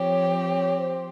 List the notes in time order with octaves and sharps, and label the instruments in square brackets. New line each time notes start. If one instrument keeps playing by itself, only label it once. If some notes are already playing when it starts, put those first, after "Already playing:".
Already playing: [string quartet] F3 C4 G4 [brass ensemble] C#5
[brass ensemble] C#5
C5